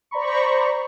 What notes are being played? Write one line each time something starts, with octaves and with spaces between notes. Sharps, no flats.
C5 D5 A#5 B5 C#6